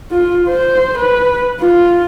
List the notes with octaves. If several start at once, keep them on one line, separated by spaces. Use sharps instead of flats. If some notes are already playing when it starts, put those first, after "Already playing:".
F4
C5
B4
F4